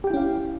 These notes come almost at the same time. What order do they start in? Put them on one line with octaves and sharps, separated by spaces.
G4 G5 E4 C#4 F5